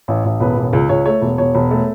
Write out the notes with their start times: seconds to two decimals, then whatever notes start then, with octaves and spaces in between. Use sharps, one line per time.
0.08 A1
0.25 A1
0.40 E1 B4
0.57 E1
0.73 C#2
0.89 C#2 C#5
1.06 A3 C#5
1.22 E1
1.38 E1 C#5
1.55 E1
1.71 A3